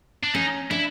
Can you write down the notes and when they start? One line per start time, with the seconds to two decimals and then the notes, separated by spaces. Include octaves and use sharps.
0.24 D4
0.34 C#4 D#4
0.71 D4 E4